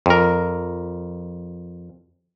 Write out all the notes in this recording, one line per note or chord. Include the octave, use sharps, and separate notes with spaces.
F2 A#4